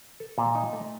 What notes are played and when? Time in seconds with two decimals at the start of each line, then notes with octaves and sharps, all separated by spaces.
0.20 A4
0.38 A#2
0.55 D#4
0.73 A3